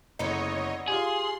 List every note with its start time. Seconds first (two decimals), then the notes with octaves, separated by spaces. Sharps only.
0.19 F#1 D3 B3 D#4 C#5 D#5
0.88 F4 G4 G#4 C6